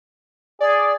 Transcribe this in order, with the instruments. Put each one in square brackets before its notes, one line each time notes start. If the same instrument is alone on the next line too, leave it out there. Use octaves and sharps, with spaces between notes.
[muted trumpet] G#4 [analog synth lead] D5